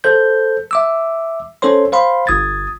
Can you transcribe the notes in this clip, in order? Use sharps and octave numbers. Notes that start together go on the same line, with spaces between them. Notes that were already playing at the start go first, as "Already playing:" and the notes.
A4 C5 G6
E5 D6 E6
C#4 A4 C5 C#5 C6
C5 F5 B5 C6
G1 D#6 G#6 A6